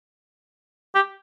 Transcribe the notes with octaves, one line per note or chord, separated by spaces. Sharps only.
G4